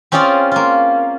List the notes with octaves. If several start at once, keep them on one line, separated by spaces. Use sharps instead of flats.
C4 C#4 F4 G#4 D5 F5
A#3 F4